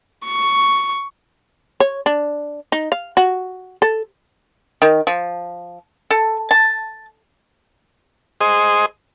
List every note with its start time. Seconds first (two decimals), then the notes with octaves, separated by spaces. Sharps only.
0.25 C#6
1.80 C#5
2.06 D4
2.72 D#4
2.92 F5
3.17 F#4
3.82 A4
4.82 D#3
5.07 F3
6.11 A4
6.51 A5
8.41 G#4 C5 D#5